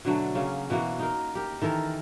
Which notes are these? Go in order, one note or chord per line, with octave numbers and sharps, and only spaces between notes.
B2 D3 F#3 A3
C#3 A#3 C#4
B2 E3 A#3 F#4
D#4 A#4
G4 A#4
D#3 E3 A4 A#4